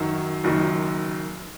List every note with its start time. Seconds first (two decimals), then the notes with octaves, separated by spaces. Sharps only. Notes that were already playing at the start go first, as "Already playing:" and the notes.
Already playing: F#2 D#3 F#3
0.44 F#1 F#2 D#3